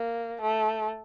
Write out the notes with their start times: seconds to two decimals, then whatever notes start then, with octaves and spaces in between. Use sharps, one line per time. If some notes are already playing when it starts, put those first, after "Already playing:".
Already playing: A#3
0.41 A3